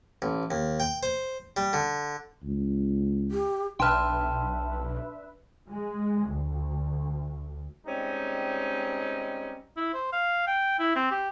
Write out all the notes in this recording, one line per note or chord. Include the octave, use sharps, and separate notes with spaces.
A1
D#2
G5
C5
G3
D3
C#2
G4
B1 D4 B4 E5 G5 A5 C6 F6
G#3
D2
G3 G#3 C4 C#4 D#4
E4
C5
F5
G5
E4
C4
G4